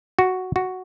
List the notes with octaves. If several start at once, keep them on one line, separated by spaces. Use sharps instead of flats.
F#4
F#4